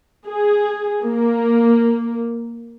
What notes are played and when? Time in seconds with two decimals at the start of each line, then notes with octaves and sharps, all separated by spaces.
0.26 G#4
1.05 A#3